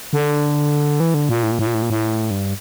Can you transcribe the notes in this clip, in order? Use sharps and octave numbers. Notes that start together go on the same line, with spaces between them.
D3
E3
D3
A#2
A2
A#2
A2
A#2
A2
A#2
A2
G2